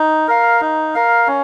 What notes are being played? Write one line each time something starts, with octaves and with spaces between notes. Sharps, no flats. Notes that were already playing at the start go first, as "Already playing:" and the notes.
Already playing: D#4
A#4 F5
D#4
A#4 F5
C#4